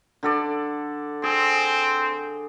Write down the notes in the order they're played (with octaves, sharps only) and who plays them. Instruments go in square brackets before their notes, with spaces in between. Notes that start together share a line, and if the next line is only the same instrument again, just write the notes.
[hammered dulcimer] D3 A4 D5
[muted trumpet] C4 [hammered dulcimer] G#4